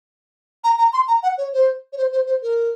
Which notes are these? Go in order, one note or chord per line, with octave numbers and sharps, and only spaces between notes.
A#5
A#5
C6
A#5
F#5
C#5
C5
C#5
C5
C5
C5
A#4